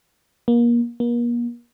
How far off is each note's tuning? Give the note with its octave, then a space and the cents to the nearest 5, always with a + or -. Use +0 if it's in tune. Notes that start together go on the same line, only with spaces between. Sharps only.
A#3 +30
A#3 +40